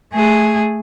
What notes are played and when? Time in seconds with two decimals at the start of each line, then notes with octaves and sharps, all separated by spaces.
0.14 A3 G#4